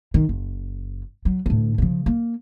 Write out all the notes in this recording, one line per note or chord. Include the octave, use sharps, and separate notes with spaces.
D#3
F#1
F#3
D2 A2
C#3 F3
A#3